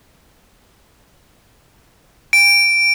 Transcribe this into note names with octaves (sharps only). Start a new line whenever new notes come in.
D7